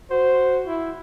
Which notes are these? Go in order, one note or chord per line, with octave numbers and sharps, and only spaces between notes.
F#4 C5
E4